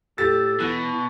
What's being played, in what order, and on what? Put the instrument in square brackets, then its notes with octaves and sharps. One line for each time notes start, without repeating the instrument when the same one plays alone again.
[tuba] A2 [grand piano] G4 A6 [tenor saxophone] A4
[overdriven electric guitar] B2 [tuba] E3 [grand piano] F#6